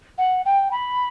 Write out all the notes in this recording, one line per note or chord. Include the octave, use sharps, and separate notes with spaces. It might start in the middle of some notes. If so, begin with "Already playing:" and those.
F#5
G5
B5